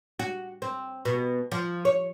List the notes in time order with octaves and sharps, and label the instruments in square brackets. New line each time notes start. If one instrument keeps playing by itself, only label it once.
[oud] F#4
C4
B2
F3
C#5